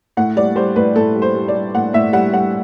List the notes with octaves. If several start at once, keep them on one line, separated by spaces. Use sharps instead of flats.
A2 F#5
G3 D5
G3 C5
A2 B4
A2 A4
G3
C5
G3
D5
G3
A2 F#5
A2 E5
G3 F#5
G3 F#5